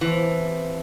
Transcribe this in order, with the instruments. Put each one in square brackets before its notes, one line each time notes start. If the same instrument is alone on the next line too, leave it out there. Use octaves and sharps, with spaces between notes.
[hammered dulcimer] C3 F3 C4 [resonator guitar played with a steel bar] E3